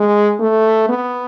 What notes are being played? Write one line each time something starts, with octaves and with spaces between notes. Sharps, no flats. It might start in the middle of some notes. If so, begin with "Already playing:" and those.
Already playing: G#3
A3
B3